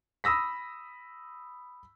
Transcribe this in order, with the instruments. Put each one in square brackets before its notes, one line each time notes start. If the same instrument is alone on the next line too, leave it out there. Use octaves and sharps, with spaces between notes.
[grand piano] B5 D#6 E6 A#6 B6